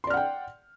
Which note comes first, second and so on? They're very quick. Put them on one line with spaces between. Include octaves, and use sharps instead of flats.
C6 D5 F6 F#5 G5